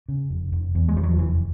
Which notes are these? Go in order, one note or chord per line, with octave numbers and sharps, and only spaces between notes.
C#3
F1
F1
E2
G#3
E2 G3
F#3
F3
F1 E3